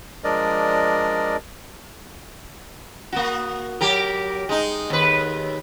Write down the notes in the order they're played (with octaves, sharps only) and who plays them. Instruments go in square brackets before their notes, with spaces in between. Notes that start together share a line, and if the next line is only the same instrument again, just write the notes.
[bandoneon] F3 G#3 D4 A#4 D5 D#5
[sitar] A#3 F#4
F#3 G4 A#4
G#3 D#4
D#2 B4